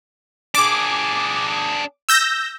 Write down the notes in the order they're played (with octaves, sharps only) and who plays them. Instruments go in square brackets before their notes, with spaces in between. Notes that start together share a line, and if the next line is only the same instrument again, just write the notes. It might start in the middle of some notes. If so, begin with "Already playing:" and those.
[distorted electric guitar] D4 G#4 [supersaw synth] D6
[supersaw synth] E6 G6 A#6